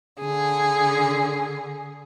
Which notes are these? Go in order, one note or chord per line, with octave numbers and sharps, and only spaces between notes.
D3 G#4